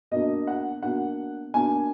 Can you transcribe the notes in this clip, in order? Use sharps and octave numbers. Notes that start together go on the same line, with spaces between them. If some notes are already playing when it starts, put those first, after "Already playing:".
B2 A#3 D4 D#5
F#5
B2 A#3 D4 F#5
B2 A#3 D4 G#5